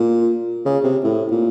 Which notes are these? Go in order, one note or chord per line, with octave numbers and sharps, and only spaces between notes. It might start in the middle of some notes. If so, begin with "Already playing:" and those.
Already playing: A#2
C#3
C3
A2
A#2